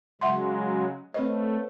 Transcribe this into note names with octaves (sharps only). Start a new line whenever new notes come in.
C#3 F#3 G#3 E5 F#5 C6
A3 C4 B4 C#5 D#5